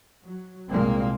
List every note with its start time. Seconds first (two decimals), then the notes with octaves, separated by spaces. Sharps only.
0.23 F#3
0.68 C2 A#2 G#3 A#3 C4